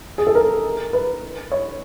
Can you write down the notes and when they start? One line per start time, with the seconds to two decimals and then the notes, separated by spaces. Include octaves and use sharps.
0.18 G#4
0.27 A4
0.35 A#4
0.93 B4
1.52 C#5